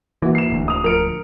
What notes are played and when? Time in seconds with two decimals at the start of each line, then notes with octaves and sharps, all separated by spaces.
0.22 E3 A#3 E4 F#4
0.35 C7 E7
0.50 D1 D2
0.68 D#6 F7
0.84 F3 A#4 C#7 D7 F7